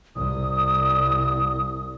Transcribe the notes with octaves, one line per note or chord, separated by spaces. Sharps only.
C2 D#6